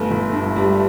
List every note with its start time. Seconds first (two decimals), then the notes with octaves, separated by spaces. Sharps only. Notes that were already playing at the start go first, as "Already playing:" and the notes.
Already playing: G1 A3
0.11 G1
0.33 G2
0.56 G3